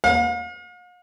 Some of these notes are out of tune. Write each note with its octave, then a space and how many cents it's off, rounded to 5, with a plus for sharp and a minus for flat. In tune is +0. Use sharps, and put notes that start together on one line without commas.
F5 +45